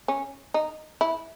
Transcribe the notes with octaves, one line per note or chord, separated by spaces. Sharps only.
C#4
D#4
E4